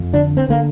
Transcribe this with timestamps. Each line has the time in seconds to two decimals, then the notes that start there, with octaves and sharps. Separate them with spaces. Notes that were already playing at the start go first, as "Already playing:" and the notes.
Already playing: F2
0.13 D3 D4
0.37 C4
0.48 D3 A#3